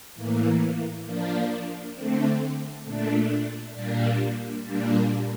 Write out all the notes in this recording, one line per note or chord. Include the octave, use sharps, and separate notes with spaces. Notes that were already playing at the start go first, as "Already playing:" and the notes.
A2 E3 A#3
F3 A#3 D4
D3 A3 C4
A#2 A3 D4
A#2 G3 A#3 D4
A#2 G3 A#3 D4